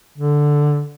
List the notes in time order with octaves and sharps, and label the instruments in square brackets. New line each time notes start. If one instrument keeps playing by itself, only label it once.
[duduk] D3